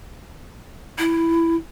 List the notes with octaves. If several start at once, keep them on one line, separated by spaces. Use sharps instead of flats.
E4